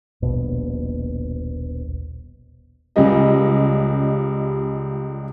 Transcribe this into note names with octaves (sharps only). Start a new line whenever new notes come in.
D#1 A#1 B2
C#2 C#3 G3 D#5